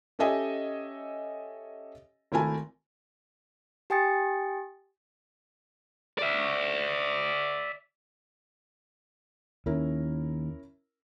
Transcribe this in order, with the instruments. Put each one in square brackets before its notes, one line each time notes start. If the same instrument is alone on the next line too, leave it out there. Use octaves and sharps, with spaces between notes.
[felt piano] C#4 G4 A4 D#5 E5 G#5
G#1 A3 E4 A#4 G#5 A5
[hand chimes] G4 G5 G#5 D#6 A6 C#7
[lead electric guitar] D5 E5
[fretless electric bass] D#2 [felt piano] C#4 E4 A#4